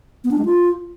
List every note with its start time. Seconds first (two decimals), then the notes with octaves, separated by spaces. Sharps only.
0.24 B3
0.31 D4
0.38 G#3
0.45 F4